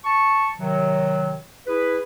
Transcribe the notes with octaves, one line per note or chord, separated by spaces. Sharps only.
A5 C#6
C3 D#3 F#3
E4 G#4 B4